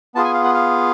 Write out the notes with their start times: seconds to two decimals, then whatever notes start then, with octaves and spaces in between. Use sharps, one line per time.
0.15 B3 F4 G#4 A5
0.24 G#5
0.34 F5
0.44 F#5
0.54 F5